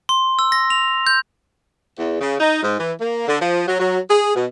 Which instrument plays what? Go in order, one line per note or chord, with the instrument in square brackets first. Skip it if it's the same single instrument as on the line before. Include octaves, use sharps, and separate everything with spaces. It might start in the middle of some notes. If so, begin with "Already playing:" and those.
[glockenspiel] C6
E6
A#6
F7
G6
[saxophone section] E2
C#3
D#4
G#2
E3
A#3
D3
F3
F#3
F#3
G#4
B2